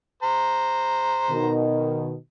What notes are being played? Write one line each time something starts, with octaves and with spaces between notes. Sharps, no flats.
C5 A#5
B2 D#3